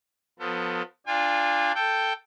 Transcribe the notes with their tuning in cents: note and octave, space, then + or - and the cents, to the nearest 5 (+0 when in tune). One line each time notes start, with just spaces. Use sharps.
F3 +30 B3 +20 A4 +35
D4 +0 F4 +0 G#5 -40
A4 +5 G5 +0